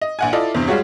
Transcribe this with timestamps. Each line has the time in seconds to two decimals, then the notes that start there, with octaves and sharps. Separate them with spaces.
0.01 D#5
0.19 A#1 F#5 G#5
0.33 E4 F4 A4 D5 D#5
0.55 E2 G2 C3
0.67 G3 G#3 F4 F#4 G#4 C#5